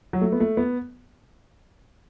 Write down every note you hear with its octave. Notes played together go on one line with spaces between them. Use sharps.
F#3
A3
B3
A3
B3